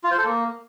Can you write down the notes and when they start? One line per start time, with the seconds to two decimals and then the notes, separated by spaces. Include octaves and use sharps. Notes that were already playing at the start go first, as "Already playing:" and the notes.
0.04 F4
0.11 C5
0.18 A4
0.25 A#3